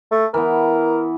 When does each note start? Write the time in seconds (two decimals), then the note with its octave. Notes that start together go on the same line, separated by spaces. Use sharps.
0.12 A3
0.34 E3 B3 A#4